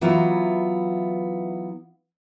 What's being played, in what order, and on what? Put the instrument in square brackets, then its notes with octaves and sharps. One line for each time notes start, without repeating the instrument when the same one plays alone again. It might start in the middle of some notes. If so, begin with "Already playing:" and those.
[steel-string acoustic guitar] E3 F#3 B3 E4 F4 A#5